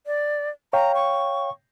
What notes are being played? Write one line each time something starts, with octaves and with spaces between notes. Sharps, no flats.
D5
C#5 F5 G5 A#5
C#6